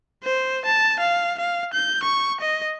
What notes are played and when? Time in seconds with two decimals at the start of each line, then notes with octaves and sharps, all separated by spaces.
0.23 C5
0.65 A5
1.00 F5
1.38 F5
1.73 G6
2.03 C#6
2.40 D#5